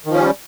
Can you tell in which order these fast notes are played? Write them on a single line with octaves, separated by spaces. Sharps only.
D#3 F3 C#4 G3